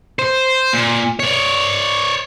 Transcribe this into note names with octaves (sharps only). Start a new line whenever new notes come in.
C5
A#2
C#5 D5